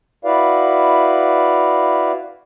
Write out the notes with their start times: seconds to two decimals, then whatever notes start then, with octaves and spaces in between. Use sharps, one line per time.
0.25 E4 F#4 B4 D5 F5